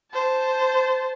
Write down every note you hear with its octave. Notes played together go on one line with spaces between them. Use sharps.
C5 A5